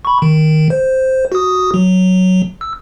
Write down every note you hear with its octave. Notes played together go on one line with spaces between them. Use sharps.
B5 C#6
D#3
C5
F#4 D#6
F#3
E6